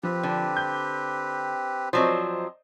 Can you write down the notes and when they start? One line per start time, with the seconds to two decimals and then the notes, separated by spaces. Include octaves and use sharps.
0.03 F3 C4 G4 B4
0.23 D3
0.56 G6
1.93 F3 F#3 C4 C5 D5 D#5